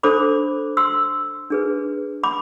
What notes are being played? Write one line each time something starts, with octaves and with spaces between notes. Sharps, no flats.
D4 A4 C5 B5 D6
C6 E6
D4 G#4 B4
B5 D6